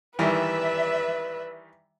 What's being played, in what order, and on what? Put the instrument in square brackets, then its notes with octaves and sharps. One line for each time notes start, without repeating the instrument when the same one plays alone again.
[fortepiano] D#3 E3 G3 [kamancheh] B4 [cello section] D5 E5